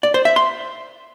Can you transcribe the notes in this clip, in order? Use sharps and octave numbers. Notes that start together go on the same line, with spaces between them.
D5
C5
E5
C6